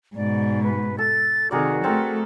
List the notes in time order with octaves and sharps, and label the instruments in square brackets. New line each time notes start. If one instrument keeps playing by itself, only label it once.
[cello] G#2 B2 [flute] D5
[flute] B4
[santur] A4 [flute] A6
[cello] C3 D#3 [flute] F#4 [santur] G#4 A#4 D5
[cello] A3 A4 [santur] C4 A#4